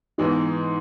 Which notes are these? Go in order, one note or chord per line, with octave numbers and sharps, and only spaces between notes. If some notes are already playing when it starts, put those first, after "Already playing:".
G#2 E3 G#3 B3 D#4